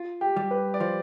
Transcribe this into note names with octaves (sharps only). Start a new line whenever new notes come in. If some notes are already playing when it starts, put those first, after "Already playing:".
Already playing: F4
G4
G3
B4
D5
F3 C5